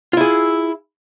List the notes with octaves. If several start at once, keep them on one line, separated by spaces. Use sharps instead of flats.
E4 F4 G#4